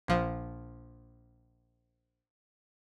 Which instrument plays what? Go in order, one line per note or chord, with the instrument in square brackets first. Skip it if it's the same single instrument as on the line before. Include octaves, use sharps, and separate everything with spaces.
[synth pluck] A#1 F3